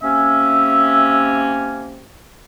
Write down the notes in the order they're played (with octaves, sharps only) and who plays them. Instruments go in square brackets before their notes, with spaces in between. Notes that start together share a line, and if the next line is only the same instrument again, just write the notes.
[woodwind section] C3 A#3 C#4 [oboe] E5